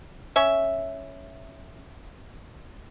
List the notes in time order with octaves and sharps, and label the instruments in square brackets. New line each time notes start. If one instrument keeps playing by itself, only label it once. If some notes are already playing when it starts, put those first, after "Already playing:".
[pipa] C#4 E5